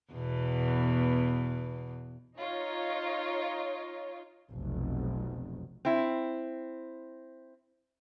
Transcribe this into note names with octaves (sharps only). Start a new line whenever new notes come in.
E2 B2
D#4 F4 C#5
F1 B1
C4 E4